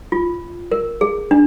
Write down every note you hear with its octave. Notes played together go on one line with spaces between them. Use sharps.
F4
A#4
G#4
D4